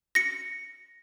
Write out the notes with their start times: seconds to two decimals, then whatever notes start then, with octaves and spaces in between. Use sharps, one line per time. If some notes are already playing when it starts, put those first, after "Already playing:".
0.15 A#6 C#7